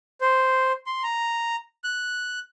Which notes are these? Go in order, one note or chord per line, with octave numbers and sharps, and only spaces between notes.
C5
C6
A#5
F#6